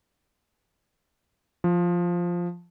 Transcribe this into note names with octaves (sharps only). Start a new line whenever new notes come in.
F3